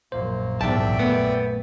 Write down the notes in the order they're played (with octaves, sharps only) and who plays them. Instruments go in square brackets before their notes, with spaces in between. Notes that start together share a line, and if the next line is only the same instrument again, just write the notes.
[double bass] A#1 F#2 [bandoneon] A#3 [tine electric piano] C5
[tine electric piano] B1 G#2 [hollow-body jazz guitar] E2 A5 [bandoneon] D5 E5 G5
[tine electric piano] A3 [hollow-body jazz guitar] B3